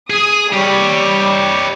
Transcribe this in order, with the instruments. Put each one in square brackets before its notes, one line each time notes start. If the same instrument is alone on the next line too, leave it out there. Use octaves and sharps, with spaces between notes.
[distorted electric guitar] G#4 [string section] D#6
[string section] G3 [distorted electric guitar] G4 C#5